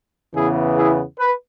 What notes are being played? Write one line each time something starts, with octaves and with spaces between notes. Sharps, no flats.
E2 C#3 E3 B3 E4 G#4
E4 G#4
B4